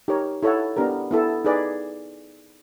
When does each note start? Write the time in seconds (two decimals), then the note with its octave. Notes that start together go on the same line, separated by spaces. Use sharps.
0.08 D#4 G4 A#4 C#5
0.43 E4 A4 C#5 F#5
0.77 B3 D4 G4 A#4
1.11 B3 E4 A4
1.45 D#4 G#4 B4 D5